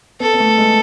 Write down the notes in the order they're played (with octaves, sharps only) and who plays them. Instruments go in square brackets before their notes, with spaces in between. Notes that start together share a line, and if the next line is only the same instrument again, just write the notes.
[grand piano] B3 [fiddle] A4
[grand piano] B3
A3
G#3